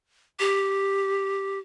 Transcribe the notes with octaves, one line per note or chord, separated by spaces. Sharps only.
G4